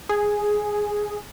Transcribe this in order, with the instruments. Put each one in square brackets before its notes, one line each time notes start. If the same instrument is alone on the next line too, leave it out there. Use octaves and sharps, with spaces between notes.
[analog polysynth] G#4